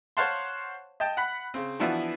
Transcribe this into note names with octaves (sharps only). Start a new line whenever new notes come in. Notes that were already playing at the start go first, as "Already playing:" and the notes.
C5 C#5 F5 F#5 A5 C6
D#5 G5 A5
F#5 B5
C#3 C4
E3 F3 B3 D4 E4 F#4